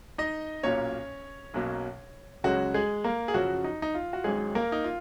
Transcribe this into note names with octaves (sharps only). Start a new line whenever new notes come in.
D#4 D#5
B1 A#2 F#3 A#3 C#4 C#5
B1 B2 F#3 A#3 C#4
C#2 C#3 F#3 G#3 C#4 F#4
G#3 G#4
A#3 A#4
G#4
F#2 C#3 F3 F#3 F#4
D#4
D#4
F4
F#4
G#1 G#2 F#3 G#3 C#4 G#4
A#3 A#4
D#4
F4